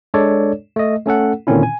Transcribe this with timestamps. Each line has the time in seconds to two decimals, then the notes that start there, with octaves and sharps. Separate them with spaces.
0.14 G#3 D4 A4 C#5 D5
0.76 A3 D#5
1.06 A3 C#4 A4 F#5
1.47 A#2 D3 D#3 C4 C#4 E4
1.63 G#5